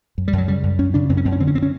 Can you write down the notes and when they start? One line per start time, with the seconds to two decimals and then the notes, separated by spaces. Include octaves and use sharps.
0.18 F#2
0.28 G3
0.33 F#2
0.38 F#3
0.48 C#3 G3
0.63 F#2
0.79 F#2 C#4
0.94 C#3 D4
1.10 F#2 C4
1.17 C#4
1.25 F#2 C4
1.32 C#4
1.40 D3 C4
1.47 C#4
1.55 D3 C4
1.62 C#4